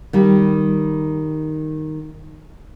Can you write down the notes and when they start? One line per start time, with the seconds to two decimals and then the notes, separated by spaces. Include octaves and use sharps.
0.13 D#3 G3